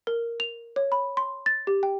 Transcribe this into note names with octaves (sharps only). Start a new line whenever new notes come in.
A#4
F7
C#5
B5
C6
A6
G4
G5